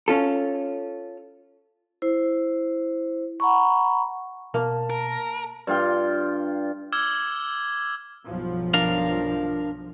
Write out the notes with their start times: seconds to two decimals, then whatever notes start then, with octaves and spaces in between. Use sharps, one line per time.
0.08 C#4 F4 A4
2.02 E4 C5
3.40 F#5 A#5 B5 C#6
4.54 B2 A#3 A5
4.90 A#4
5.67 G2 F4 G5
6.92 D6 E6 F6 G#6 G7
8.25 B1 G2 F3
8.74 D4 A#4 F5